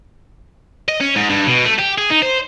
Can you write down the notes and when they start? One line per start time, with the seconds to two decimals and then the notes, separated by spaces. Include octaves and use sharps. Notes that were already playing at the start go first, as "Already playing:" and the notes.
0.88 D#5
1.00 C#4
1.16 G#2
1.29 G2
1.46 B2
1.65 A3
1.78 G4
1.98 G#4
2.10 D#4
2.22 C5